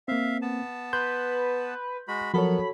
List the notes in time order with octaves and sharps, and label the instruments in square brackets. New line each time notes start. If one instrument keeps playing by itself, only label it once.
[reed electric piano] A#3 C4 [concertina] E5 F5
[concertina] B3 A5
[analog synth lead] B4 [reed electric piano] C6 [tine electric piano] G6
[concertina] G#3 F#4 B5
[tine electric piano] F3 F#3 A#4 [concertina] B3 [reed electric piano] F#4 A4 C#5 [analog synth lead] B5